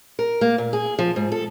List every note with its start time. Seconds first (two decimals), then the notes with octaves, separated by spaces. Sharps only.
0.19 A#4
0.41 A#3
0.58 A#2
0.73 G#4
0.99 F3
1.16 G#2
1.32 A4